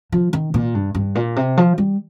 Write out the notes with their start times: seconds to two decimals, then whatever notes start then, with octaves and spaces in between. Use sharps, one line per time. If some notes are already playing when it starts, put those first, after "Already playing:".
0.12 F3
0.33 D#3
0.54 A#2
0.75 G2
0.95 G2
1.15 A#2
1.36 C3
1.57 F3
1.78 G3